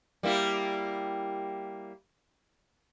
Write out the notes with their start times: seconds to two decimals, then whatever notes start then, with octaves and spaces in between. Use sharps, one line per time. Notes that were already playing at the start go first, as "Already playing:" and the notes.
0.23 G3 A#3 E4